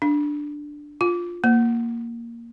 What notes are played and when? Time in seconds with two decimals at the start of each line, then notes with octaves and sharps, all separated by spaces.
0.02 D4
1.01 F4
1.44 A#3